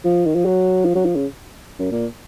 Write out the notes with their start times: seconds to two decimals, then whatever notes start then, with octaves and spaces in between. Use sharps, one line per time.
0.05 F3
0.26 D#3
0.35 F3
0.45 F#3
0.85 F3
0.95 F#3
1.05 F3
1.15 C#3
1.79 F#2
1.91 A#2